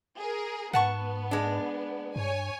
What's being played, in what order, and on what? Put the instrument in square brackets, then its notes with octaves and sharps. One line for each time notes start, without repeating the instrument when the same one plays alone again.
[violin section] G#4 A#4
[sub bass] G#2 [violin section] B3 [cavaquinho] F#5 A5 C#6
[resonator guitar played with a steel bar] G#3 D4
[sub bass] G2 [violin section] C#5 G#5